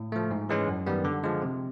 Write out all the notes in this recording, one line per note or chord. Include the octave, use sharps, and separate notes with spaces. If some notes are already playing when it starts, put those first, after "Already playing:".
Already playing: A2
F3 A3
G#2
E3 G#3 C#4
F#2
D#3 G3 B3
D3
F3 G#3
C3